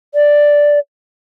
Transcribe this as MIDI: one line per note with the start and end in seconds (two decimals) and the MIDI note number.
0.14 0.79 74